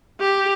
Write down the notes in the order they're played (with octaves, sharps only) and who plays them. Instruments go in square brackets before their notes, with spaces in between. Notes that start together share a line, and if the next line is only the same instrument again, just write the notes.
[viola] G4